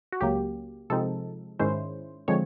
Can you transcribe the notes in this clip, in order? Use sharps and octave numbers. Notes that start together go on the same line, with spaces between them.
F#4
C#2 C#3 F#3 A#3 G4
C3 F3 G#3 C4 D#4 A4
G#2 D#3 G#3 C#4 E4 C5
D3 F3 G#3 C4 C#5